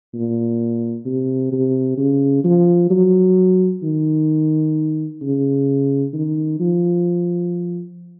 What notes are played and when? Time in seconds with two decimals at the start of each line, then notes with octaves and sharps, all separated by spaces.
0.14 A#2
1.05 C3
1.52 C3
1.97 C#3
2.44 F3
2.90 F#3
3.83 D#3
5.22 C#3
6.13 D#3
6.60 F3